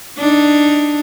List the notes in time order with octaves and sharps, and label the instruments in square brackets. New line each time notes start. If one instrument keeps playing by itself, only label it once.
[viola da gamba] D4 D#4